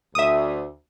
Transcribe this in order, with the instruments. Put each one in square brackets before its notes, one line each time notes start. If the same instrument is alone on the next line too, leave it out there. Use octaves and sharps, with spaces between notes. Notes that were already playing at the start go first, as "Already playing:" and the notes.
[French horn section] D2 [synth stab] E5 D#6